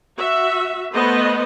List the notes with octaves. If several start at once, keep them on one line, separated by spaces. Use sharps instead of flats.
F#4 E5
A3 B3 B4 C5 D#5